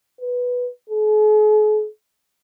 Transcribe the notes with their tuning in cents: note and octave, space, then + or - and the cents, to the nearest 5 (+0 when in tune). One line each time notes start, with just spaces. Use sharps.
B4 -5
G#4 +45